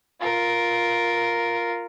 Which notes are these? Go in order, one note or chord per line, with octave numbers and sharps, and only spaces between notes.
F4 A#4